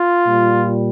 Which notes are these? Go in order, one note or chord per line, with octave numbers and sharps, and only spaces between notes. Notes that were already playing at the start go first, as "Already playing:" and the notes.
Already playing: F4
A#2 G3